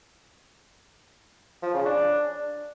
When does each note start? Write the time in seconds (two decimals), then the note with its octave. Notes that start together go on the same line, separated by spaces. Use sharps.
1.62 F3
1.74 C#3
1.85 D4